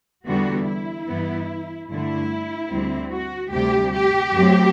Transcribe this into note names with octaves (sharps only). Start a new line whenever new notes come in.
E2 D3 G3 B3 F#4
E4
G2 E3 B3
G2 D3 A3 E4
D2 D3 G3 C4
F#4
D2 C3 G3 G4
G4
F#2 F#3 A3 C4